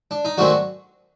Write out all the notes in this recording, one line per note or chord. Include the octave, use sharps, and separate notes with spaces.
D4
D#4
F#2 D#3 F#3 A3 C4 D4 F#4